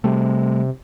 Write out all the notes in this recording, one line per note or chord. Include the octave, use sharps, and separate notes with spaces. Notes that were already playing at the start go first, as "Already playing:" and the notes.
C3 G3 A3